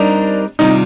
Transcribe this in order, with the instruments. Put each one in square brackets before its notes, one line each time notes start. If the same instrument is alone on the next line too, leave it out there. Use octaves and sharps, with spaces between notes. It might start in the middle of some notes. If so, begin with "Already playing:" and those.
Already playing: [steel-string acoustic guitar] G3 C4 D#4 A#4 [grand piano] D4
[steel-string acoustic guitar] C3 D#3 G3 D4 F4 [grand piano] D#4